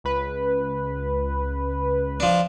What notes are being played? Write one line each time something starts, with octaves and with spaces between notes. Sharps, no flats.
C#2 B4
F3 D4